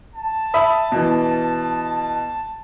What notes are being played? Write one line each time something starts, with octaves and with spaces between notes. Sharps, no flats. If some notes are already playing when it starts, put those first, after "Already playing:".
A5
E5 B5 D#6
B2 E3